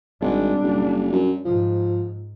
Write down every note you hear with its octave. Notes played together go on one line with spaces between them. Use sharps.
G#1 G3 D4
F#1
F#2
G#2 F3